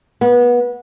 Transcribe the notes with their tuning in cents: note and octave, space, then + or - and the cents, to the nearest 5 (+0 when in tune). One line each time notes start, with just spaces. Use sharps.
B3 -25